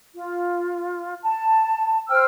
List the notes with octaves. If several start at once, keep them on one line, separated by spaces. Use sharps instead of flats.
F4
A5
C5 G5 E6 F6